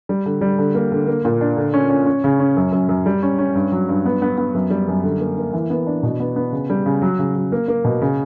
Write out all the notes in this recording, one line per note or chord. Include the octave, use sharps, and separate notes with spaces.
G3
D3
G3
D3
A#3
D3
A#3
A#2
D4
D3
C#4
C#4
C#4
C#3
C#4
F#2
F#2
F#2
G3
C#4
C#4
G2
F#3
G2
B3
B3
B3
F#2
G3
F#2
D3
A#3
A#3
E3
B3
D4
B2
B3
B3
C#3
G3
C#3
F#3
C#3
F#3
A#3
A#3
B2
C#3